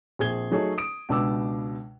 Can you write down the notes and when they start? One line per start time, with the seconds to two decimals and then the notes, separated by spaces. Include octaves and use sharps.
0.19 A#1 C4 G#4 G#6 G7
0.51 F#3 A3 D#4 G#4 A4 C#5
0.78 D#6 D7
1.09 C#2 B2 D4 B4 D6 E6